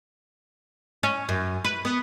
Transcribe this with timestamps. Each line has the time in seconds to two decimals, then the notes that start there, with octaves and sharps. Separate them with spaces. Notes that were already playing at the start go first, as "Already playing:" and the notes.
1.03 C#4
1.29 F#2
1.65 B4
1.85 B3